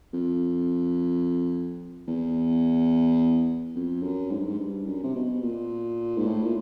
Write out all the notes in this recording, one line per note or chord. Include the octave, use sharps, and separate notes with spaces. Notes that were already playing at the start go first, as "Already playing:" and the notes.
F2
E2
F2
F#2
G#2
G2
G#2
G2
F#2
C3
B2
A#2
G#2
A2
A#2